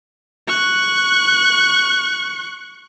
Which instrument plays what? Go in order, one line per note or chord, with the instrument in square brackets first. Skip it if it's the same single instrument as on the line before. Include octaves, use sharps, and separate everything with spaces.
[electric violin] C#6 F#6